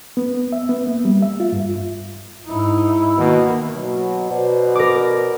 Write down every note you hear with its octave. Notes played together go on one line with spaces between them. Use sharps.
B3
E5
B3
A#3
G3
E5
F4
G2
G#2 D#4 E4
B2 D#3 A#3
B2 F#3
B2 B4 C5 D5
A#4 D6